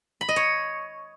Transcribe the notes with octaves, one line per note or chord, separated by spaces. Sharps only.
B5
D#5
C#5